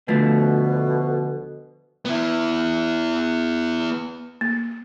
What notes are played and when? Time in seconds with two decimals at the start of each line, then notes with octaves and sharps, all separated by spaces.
0.08 D2 B2 D3 F3 A3
2.05 B3 E4
4.41 A#3